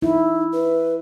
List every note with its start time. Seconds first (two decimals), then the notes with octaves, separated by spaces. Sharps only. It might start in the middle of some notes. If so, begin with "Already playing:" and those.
0.02 D#4 E4
0.52 B4